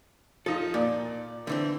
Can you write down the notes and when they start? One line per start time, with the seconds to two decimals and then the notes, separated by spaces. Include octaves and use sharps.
0.46 F3 D#4 A4
0.74 A#2 D5
1.47 D3 E3 C4